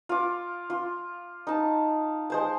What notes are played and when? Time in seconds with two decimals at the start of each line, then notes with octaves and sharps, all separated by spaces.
0.09 F4 D6
0.70 F4
1.47 D#4 A5
2.30 G#3 C5 A5